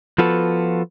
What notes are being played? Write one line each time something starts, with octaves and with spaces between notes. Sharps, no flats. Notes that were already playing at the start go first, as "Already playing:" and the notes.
F3 B3 F4 F#4 A4 B4